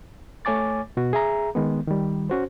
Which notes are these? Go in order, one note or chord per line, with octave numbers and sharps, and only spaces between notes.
A3 C#5 G#5 D6 A6
B2 F#4
G#4 E5 A#5
D#3 G#3 B3
D#3 G3
C#4 F#4 C5